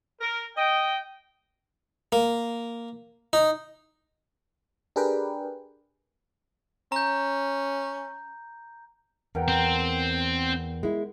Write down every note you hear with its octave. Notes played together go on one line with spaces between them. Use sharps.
A#4
D#5 G5
A#3
D#4
D4 G4 G#4 A#4 B4 G5
C#4 A#5 G6
E2 A#4 F#5 G5
C4
G#3 E4